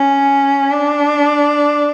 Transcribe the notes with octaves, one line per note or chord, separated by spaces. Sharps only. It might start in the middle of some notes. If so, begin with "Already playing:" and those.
Already playing: C#4
D4